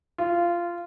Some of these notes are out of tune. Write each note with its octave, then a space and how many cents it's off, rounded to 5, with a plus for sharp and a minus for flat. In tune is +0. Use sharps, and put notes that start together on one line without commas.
F4 -15